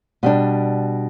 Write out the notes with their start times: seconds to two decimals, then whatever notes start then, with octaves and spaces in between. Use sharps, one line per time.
0.23 B2 G3 D4